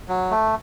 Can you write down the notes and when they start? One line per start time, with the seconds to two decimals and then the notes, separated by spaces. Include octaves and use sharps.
0.09 F#3
0.31 A3